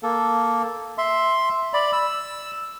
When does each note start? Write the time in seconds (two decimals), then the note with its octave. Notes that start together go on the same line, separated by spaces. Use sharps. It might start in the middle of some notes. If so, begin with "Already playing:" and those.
0.03 A#3 A4
0.98 E5 C6
1.74 D5 B5
1.93 E6